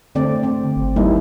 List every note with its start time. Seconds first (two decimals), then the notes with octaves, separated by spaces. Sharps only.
0.15 D3 A3 C4 D5
0.43 C4
0.76 G1
0.96 D#2 G3 E4